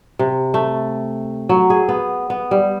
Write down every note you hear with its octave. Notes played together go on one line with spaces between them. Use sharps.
C3
A3
F#3
G#4
B3
B3
G3